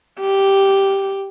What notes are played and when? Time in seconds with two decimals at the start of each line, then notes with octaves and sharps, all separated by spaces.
0.20 G4